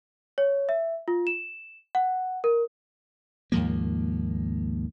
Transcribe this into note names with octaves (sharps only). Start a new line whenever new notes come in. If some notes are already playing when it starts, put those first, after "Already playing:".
C#5
E5
F4
E7
F#5
A#4
D#2 G#2 F3 A#3